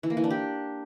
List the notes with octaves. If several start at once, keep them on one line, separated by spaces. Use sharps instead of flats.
E3
A#3
E3
D4
G4